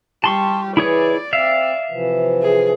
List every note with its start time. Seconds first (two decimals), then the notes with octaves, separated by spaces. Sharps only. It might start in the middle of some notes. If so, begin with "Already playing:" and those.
0.24 G3 G4 A5 C6 C#6
0.77 E3 E4 G#4 C#5 D5
1.33 C4 E5 F5
1.91 C3 E3 F3
2.42 G#4